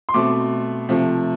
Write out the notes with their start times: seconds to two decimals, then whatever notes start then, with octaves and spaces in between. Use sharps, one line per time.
0.09 C6
0.14 B2 A3 C4 D6
0.89 C3 F3 A3